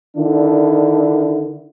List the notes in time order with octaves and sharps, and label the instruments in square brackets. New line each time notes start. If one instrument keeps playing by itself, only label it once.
[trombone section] D3 D#3 D4 E4